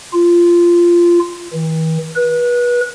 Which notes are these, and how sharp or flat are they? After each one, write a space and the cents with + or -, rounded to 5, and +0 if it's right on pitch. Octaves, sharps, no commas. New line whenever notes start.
F4 -15
E3 -45
B4 -30